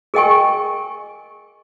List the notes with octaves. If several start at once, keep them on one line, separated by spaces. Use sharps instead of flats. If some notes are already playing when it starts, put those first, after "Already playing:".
G#4 A#4 D#5 G5 G#5 C#6